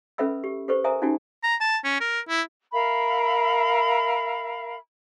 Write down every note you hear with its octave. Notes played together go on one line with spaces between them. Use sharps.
C#4 A4 B4 E5 B5 E6
G4
G4 A4 B4 C5 C#6
A#4 C5 E5 G#5 A#5 D#6
C#4 D#4 E4 F#4 G4 G#5
A#5
A5
C#4
A#4
E4
A#4 E5 F5 B5